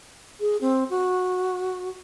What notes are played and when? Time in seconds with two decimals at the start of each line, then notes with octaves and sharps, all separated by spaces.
0.40 G#4
0.61 C4
0.90 F#4